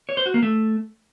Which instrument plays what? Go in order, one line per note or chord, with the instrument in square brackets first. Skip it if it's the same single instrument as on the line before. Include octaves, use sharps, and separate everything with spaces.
[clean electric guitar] C#5
C5
F#4
A#3
A3